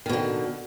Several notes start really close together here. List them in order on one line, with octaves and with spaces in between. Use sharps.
D#3 B2 D3